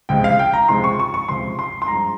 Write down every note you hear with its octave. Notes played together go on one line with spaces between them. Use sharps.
C#2 C3 F3 G#3 G5
F5
G5
A#5
C#2 C3 F3 G#3 C6
C#6
C#6
C#6
C#2 C3 F3 G#3 C6
C6
C6
G2 F3 G#3 A#5